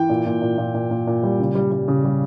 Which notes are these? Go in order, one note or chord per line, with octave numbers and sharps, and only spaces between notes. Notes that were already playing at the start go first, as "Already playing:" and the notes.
Already playing: E3 G5
A#2
A#2
A#2
A#2
A#2
A#2
A#2
G3
C#3
G3
G3
C#3
G3